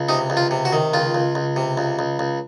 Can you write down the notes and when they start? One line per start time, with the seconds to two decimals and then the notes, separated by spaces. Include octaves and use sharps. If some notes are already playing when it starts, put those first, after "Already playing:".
Already playing: C#2
0.09 C3 D#4
0.30 C#2
0.37 F4
0.51 C3
0.65 F#4
0.72 D#3
0.93 C#2 F4
1.15 C#2
1.35 C#2
1.56 C3
1.77 C#2
1.99 C#2
2.19 C#2